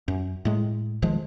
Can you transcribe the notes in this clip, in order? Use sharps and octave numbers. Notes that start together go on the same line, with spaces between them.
F#2
A2 G#3
B1 D#3 F3 G#3